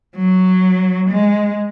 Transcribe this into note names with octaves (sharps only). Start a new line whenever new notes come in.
F#3
G#3